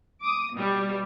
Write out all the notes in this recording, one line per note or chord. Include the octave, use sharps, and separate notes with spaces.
D6 D#6
B2 G3